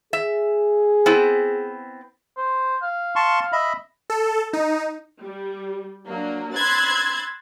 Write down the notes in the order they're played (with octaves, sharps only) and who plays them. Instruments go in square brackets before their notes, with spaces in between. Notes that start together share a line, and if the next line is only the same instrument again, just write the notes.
[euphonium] G#4 [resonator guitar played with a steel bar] E5
[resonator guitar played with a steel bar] B3 C4 E4
[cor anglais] C5
F5
[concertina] A5 C6 C#6
D#5 E5 B5
[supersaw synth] A4
D#4
[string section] G3
F#3 A#3 D4
B5 C6 E6 F#6 G#6 A6